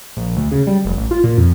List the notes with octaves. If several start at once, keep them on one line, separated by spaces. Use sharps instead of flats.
A#1
D2
C#3
G3
F1
A1
F4
A#2
F2